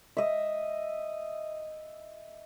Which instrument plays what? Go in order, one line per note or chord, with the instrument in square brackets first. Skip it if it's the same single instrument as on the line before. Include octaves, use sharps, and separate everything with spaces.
[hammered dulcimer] D#5 E5